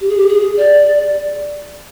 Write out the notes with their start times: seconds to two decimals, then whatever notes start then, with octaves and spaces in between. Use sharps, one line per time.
0.01 G4
0.09 G#4
0.17 G4
0.29 G#4
0.57 D5